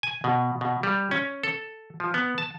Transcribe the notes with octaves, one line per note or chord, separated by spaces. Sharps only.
G#5
B2
B2
G3
C#4
A4
F3
B3
A5